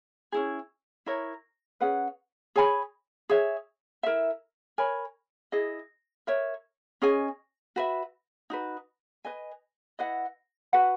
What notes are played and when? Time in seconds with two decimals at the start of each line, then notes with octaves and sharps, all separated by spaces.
0.32 C#4 E4 G#4
1.06 E4 A#4 C#5
1.80 C#4 G#4 B4 F#5
2.56 G#4 C#5 G#5 B5
3.29 G#4 C#5 E5
4.03 E4 A#4 E5
4.78 A#4 C#5 G#5 B5
5.52 E4 G#4 D#5
6.27 A#4 C#5 E5
7.02 C#4 G#4 D#5 G#5
7.76 F#4 B4 E5
8.50 D#4 F#4 B4
9.25 B4 D#5 G#5
9.99 E4 B4 D#5 F#5
10.73 F#4 B4 F#5